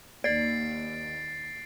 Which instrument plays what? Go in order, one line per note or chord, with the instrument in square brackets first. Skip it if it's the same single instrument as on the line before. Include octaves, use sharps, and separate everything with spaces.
[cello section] D#2 [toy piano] D5 [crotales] A6 C7 D7